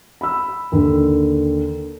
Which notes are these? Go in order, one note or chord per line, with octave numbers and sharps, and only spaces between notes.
B5 E6
D#2 D3